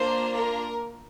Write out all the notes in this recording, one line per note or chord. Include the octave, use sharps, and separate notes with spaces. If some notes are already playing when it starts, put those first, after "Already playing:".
Already playing: A#3 D4 F4 C5
A#4